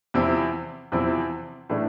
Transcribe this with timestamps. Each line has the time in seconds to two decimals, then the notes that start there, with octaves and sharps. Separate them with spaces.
0.14 E2 C3 F3 C4 E4
0.92 E2 C3 F3 C4 E4
1.69 A2 E3 A3 D4 A4